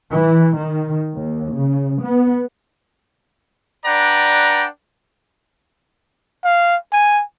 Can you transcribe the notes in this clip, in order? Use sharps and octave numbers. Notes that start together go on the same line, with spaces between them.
E3
D#3
D#2
C#3
B3
D4 B4 D5 F#5 G5 A#5
F5
G#5